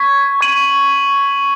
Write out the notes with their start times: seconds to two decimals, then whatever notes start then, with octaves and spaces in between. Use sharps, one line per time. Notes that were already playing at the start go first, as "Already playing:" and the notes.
Already playing: C#6 G#6 B6
0.41 C#6 G#6 D#7 F#7